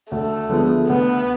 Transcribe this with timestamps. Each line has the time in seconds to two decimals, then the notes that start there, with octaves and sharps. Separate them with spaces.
0.11 D2 A3
0.49 D3 F3 G#3 B3
0.88 D2 B3